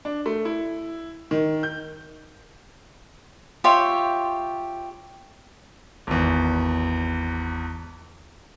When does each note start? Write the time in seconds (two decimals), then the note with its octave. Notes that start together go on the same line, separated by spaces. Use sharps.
0.05 D4
0.26 A3
0.45 E4
1.31 D#3
1.63 G6
3.64 F4 G4 C#5 E5
6.07 G#1 E2